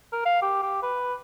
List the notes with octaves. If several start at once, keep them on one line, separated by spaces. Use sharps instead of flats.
A#4
F5
G4
G4
B4